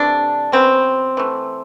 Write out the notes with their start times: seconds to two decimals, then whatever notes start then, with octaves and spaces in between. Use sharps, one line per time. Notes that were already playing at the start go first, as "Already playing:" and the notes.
Already playing: C3 E3 A3 D4
0.52 C#3 F#3 B3 C4
1.17 E3 A3